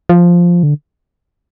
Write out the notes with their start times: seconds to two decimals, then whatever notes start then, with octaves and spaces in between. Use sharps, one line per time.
0.09 F3
0.63 D3